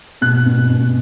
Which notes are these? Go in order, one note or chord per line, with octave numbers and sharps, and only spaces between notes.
B2 F#6
B2
B2